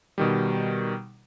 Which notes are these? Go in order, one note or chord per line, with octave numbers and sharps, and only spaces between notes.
B2 D#3 G3